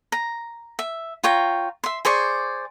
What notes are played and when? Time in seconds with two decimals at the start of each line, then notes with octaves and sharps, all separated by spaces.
0.12 A#5
0.79 E5
1.24 F4 C#5 G5 A#5
1.84 E5 C6
2.05 G#4 C5 D5 C#6